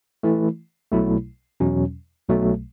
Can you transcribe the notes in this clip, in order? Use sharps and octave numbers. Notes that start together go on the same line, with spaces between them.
E3 A3 E4
B1 B2 F#3 A3 E4
E2 B2 F#3 C#4
B1 B2 F#3 A3